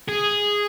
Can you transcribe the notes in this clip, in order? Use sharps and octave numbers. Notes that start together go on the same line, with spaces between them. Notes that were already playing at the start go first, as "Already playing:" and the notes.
G#4